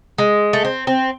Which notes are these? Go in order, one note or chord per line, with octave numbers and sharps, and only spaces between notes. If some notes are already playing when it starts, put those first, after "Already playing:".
G#3
A3
C4
C4